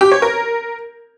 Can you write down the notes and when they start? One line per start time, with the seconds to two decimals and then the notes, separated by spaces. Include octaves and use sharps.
0.01 G4
0.12 C#5
0.22 A#4